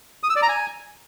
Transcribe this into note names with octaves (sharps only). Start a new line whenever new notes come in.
D#6
E6
D5
A#5
G#5